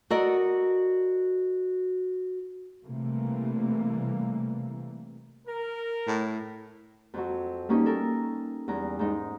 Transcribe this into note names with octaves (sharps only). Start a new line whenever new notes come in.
F#4 A4 A#4 D5 D#5
C3 E3 G3 A3 A#3
A#4
A2
F2 F#3
G3 A#3 C#4 D#4 G4
A4 A#4
E2 G3 A#5
G#2 D#4